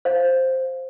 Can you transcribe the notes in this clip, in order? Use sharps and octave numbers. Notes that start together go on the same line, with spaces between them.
C5 F5